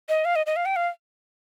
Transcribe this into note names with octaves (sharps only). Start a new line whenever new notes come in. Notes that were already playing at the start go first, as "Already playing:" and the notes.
D#5
F5
D#5
D#5
F5
G5
F5